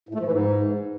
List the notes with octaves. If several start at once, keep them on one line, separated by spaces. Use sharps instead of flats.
A2
A3
F3
E3
G#2